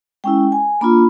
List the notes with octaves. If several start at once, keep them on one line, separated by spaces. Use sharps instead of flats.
G#3 C#4 E4 G5
G#5
A#3 D4 F4 B5